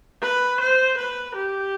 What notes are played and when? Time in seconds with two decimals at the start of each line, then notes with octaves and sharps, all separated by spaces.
0.22 B4
0.60 C5
0.98 B4
1.35 G4